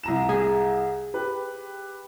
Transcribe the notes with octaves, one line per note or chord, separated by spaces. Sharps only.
C2 A#5 E7
G#4
G4 B4